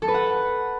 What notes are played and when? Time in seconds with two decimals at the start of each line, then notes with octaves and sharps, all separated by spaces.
0.02 A4
0.08 B4
0.14 F#5